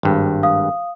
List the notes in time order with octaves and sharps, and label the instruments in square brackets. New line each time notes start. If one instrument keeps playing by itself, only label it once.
[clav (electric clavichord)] G#1 G2
[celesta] F5 D#6